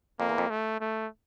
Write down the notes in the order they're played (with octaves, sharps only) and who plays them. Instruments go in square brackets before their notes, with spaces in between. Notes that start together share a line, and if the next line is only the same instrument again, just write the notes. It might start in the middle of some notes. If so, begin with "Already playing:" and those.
[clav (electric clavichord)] F2 [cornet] A#3
[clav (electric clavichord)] E2
F2
[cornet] A3
A3